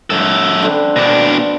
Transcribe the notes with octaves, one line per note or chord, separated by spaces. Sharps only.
F#2 A4
D3 C4 B4
B2 D4